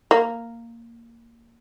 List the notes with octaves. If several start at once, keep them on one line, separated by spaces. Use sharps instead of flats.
A#3